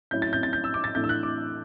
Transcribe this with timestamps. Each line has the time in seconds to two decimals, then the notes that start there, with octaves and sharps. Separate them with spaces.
0.11 A2 F#3 C#4 E4 G6
0.22 A6
0.33 G6
0.43 A6
0.53 G6
0.64 E6
0.74 D6
0.84 A6
0.95 A2 E3 A3 D4 G6
1.04 E6
1.09 F#6
1.23 D6